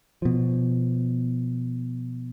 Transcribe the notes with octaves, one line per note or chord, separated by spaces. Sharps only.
B2 F3